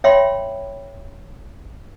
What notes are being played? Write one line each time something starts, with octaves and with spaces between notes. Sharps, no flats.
C#5 E5 F5 G5 B5 C6